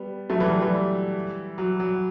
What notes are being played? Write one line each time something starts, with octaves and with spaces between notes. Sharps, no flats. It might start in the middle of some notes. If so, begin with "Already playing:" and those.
Already playing: G3 B3
F#3 A3
E3 G3
F#3
E3 G3
F#3
F#3